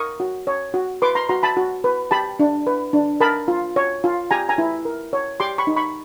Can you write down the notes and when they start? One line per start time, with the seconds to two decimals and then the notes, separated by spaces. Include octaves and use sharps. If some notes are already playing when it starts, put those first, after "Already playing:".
Already playing: A#4 C#6 D#6
0.20 F#4
0.47 C#5
0.74 F#4
1.02 B4 C6 D6
1.15 A#5 C6
1.29 F#4 A#5 C6
1.43 A5 B5
1.57 F#4
1.84 B4
2.11 G4 A5 B5
2.39 D4
2.67 B4
2.93 D4
3.20 A#4 A5 B5
3.48 F4
3.76 C#5
4.04 F4
4.31 G4 G#5 A#5
4.49 G#5 A#5
4.58 E4
4.85 A#4
5.13 C#5
5.40 G4 C6 D6
5.58 B5 C#6
5.67 D#4
5.76 B5 C#6